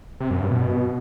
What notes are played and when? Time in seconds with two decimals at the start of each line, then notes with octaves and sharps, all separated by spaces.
0.20 C3
0.31 F#2
0.41 G2
0.51 B2